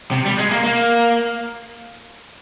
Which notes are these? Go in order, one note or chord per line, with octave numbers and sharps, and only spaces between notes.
C3
G3
G#3
A#3
A#3